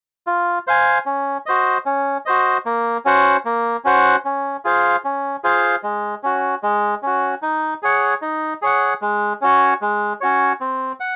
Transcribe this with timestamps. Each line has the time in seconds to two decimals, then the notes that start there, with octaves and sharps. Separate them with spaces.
0.27 F4
0.67 C5 F5 G#5
1.06 C#4
1.46 F#4 C5 D#5
1.86 C#4
2.26 F#4 C5 D#5
2.66 A#3
3.05 C#4 F#4 C5 F#5
3.45 A#3
3.85 C#4 F#4 C5 F#5
4.25 C#4
4.65 F4 G#4 C5 F5
5.05 C#4
5.44 F4 G#4 C5 F5
5.83 G#3
6.23 C#4 F#4
6.63 G#3
7.03 C#4 F#4
7.42 D#4
7.83 G#4 C#5 F#5
8.22 D#4
8.62 G#4 C#5 F#5
9.01 G#3
9.41 C#4 F#4 C#5
9.81 G#3
10.21 C#4 F#4 C#5
10.61 C4
11.00 F#5